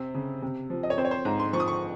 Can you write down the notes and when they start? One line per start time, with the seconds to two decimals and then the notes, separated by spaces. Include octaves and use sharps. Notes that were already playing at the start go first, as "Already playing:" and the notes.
Already playing: C3 C4
0.15 C#3
0.42 C3
0.70 F3
0.83 D#5
0.90 C#5
0.98 C4 C5
1.05 C#5
1.11 C5
1.25 G#2 A#5
1.40 C6
1.53 F3 C#6
1.60 D#6
1.68 C#6